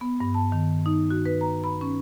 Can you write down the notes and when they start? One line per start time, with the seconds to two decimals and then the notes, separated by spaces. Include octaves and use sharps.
0.01 B3
0.20 G2
0.34 A5
0.52 D#3
0.86 D#4
1.11 F#4
1.26 B4
1.41 A#5
1.64 B5
1.81 C#4